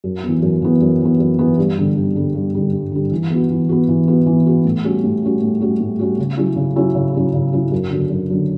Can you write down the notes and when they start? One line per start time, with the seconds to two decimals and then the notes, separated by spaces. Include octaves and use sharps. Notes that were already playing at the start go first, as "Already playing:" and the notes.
0.04 F#2
0.23 B3
0.28 E3
0.42 F#2
0.62 E3 B3
0.81 F#2
1.00 E3 B3
1.20 F#2
1.39 E3 B3
1.58 G2
1.78 D3 G3
1.96 G2
2.15 D3 G3
2.35 G2
2.54 D3 G3
2.73 G2
2.92 D3 G3
3.12 E3
3.30 B3 F#4
3.50 E3
3.69 B3 F#4
3.89 E3
4.08 B3 F#4
4.26 E3
4.46 B3 F#4
4.65 A2
4.84 G3 C#4 F#4
5.04 A2
5.23 G3 C#4 F#4
5.41 A2
5.61 G3 C#4 F#4
5.80 A2
5.99 G3 C#4 F#4
6.19 C#3
6.37 F#3 C#4 E4
6.56 C#3
6.76 F#3 C#4 E4
6.95 C#3
7.14 F#3 C#4 E4
7.34 C#3
7.53 F#3 C#4 E4
7.72 F#2
7.91 D3 F#3
8.10 F#2
8.30 D3 F#3